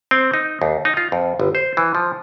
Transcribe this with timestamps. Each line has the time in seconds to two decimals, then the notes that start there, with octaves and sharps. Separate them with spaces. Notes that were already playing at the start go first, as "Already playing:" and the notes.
0.11 C4
0.34 D#4
0.62 D#2
0.85 D#4
0.97 F4
1.12 F2
1.40 G1
1.55 C5
1.77 E3
1.95 F3